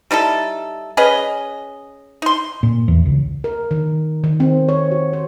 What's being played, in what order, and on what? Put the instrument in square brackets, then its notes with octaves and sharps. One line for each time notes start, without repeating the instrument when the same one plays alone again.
[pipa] G3 D#4 E4 A4
C#4 G#4 B4 D#5
D#4 C6
[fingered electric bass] A#2
E2
C#2
[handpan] A#4
D#3
D#3
C4
C#5
F#4
C5